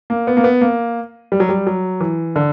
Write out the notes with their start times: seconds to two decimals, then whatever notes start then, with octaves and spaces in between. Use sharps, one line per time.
0.10 A#3
0.27 B3
0.37 A#3
0.44 B3
0.61 A#3
1.32 G3
1.40 F#3
1.49 G3
1.67 F#3
2.00 E3
2.36 D3